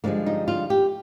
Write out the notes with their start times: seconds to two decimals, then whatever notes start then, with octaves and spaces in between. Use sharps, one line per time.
0.04 G2 D3 F3 G#3 A#3
0.26 D#4
0.48 F4
0.70 G4